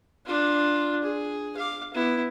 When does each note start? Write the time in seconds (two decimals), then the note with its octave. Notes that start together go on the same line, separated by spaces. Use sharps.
0.26 D4 F4
1.04 G#4
1.56 F5 D6
1.94 B3 E4